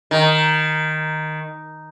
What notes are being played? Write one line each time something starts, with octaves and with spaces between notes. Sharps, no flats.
D#3